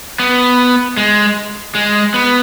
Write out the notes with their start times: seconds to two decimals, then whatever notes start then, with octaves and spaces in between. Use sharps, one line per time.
0.19 B3
0.97 G#3
1.75 G#3
2.14 B3